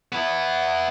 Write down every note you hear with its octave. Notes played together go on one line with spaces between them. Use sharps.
B3 E4